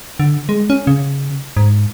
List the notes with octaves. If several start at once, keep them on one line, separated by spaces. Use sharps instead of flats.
D3
G#3
C#4
C#3
G#2